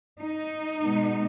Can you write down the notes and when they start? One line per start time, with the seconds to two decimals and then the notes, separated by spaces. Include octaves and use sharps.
0.21 D#4
0.83 B2 G#3 B3